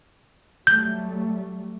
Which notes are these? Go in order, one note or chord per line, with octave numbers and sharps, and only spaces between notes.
F#3 G3 A3 G6